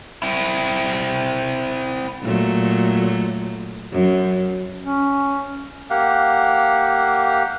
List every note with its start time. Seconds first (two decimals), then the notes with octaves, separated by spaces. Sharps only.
0.22 C4 E4
2.22 A#2 F#3 A3
3.92 F#2
4.82 C#4
5.90 A#3 G4 F5 F#5